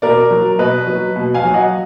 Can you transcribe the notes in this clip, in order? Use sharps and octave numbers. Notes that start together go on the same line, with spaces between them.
B2 A#4 D5
F#3
B2 B4 D#5
F#3
B2
F5 G#5
F#3
D#5 F#5